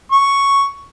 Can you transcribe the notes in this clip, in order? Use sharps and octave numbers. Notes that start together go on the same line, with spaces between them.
C#6